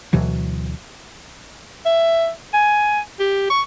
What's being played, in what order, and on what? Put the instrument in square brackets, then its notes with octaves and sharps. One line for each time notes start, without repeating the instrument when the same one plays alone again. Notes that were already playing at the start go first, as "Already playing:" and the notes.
[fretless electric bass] D2 B2 E3 F#3
[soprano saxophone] E5
G#5
G4
C#6